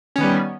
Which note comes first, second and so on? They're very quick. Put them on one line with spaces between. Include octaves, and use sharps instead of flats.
C#4 D#3 B3 G3